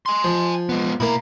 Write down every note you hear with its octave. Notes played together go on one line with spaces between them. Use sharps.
G#5 C6
F3
G#3 B3
B2 A#3 E4 A#5